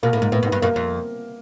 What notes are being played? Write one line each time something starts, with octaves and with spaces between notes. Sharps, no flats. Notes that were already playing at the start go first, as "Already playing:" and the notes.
B2 A#3
A2
G#2 A#3
A2 B3
G#2
B3
G2
F#2 A#3
F2